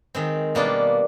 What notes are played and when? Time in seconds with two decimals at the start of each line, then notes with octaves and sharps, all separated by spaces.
0.15 D#3 G#3 C4
0.55 B2 G3 A#3 D4 F4